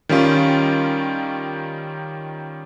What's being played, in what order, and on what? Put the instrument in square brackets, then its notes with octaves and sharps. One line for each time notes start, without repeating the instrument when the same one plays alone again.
[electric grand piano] D#3 G3 C#4 F4